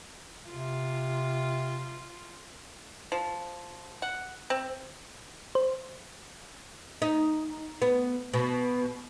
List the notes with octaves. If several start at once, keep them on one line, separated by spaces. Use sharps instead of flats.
C3 F4
F3
F#5
C4
C5
D#4
B3
B2